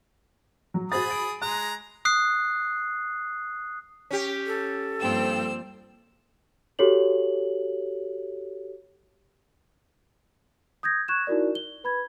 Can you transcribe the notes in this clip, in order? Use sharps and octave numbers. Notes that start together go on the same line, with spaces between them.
F#3
F#4 G#4 C5 B5 D#6 A6
D7
G#3 A#5 F#6
D#6 F#6 C7
C#4 G4
A4
G2 F3 A#3 C4 G5 E6
F#4 G4 A4 C#5 F#7
D#6 G6 G#6 A#6
C#6 F#6 G#6 E7
D#4 E4 F#4 A#4 D5
G7
B4 B5 G#6